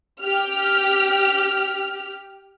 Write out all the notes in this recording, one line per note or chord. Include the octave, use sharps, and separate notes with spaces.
G4 F6